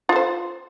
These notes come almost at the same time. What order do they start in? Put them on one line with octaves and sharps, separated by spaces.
F4 A4 C5